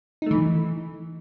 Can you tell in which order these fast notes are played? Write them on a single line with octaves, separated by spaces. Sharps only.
D#4 A3 E3